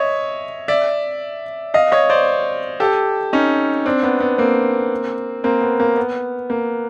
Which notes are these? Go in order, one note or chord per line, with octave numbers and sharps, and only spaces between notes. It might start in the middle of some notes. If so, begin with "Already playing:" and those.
Already playing: C#5 D#5 E5
D5 E5
D#5 F5
C#5 D#5
C5 D5
G4 A4
C#4 D#4
C4 D4
B3
B3
A#3 C4
A#3 C4
B3
A#3
B3
A#3